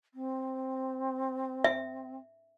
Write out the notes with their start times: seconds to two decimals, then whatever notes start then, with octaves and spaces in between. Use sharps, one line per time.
0.14 C4
1.64 E5